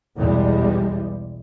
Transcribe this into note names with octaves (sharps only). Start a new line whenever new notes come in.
B1 E2 G3 G#3